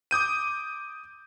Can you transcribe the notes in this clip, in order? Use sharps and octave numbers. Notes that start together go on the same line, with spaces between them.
D6 D#6 G6 D#7